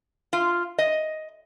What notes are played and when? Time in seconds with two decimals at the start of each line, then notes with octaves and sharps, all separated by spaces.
0.33 F4
0.79 D#5